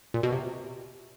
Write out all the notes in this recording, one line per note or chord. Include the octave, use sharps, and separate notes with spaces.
A#2
B2
C3